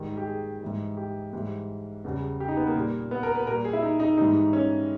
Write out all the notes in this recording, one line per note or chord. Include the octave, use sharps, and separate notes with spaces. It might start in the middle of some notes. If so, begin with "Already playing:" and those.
Already playing: G#2 D#3 G3
G4
G#4
G#2 E3 G3
G4
G#2 E3 G3
E2 C#3 G3
G4
D#4
B3
A#3
A#2 G3
B3
A#4
B4
A#2 G3 A#4
G#4
E4
D#4
D#4
G#2 E3 G3 D#4
C#4